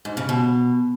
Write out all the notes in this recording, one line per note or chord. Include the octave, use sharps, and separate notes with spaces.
G#2
C#3
B2